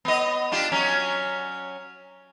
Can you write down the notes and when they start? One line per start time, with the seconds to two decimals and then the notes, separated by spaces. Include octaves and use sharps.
0.05 B3 D#5
0.52 D4 F4 G4
0.72 F#3 C#4